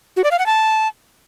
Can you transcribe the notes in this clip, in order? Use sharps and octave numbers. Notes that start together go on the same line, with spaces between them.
F#4
D5
F5
F#5
A5